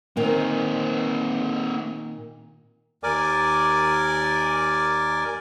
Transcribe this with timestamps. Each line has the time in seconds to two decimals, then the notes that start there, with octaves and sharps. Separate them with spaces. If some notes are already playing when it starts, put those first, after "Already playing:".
0.17 A#2 D#3 A#3 C4
3.03 D#2 A#4 D5 G#5 D6